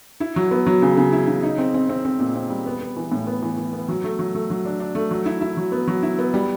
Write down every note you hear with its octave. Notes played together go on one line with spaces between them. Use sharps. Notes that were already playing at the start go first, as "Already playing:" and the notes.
E4
F#3
B3
F#3
C#3
C#3
E4
C#3
D#4
C4
C4
C4
C4
A#2
C4
G3
B3
B3
E3
A2
B3
E3
E3
B3
F#3
A3
F#3
A3
F#3
D4
D4
A3
F#3
E4
E4
F#3
B3
F#3
E4
B3
G3